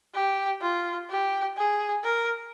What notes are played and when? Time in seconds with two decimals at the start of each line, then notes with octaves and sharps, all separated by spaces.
0.15 G4
0.61 F4
1.10 G4
1.57 G#4
2.04 A#4